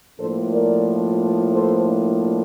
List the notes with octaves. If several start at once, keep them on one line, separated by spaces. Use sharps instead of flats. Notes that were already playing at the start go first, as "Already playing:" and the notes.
A2 F3 A#3 D4 A4 C5
A#4 D5
A4 C5